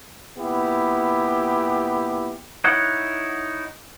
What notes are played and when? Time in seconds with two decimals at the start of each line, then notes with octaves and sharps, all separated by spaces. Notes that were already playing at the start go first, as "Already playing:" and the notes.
0.37 A#2 B3 E4 G4
2.64 D#4 E4 C#5 F#5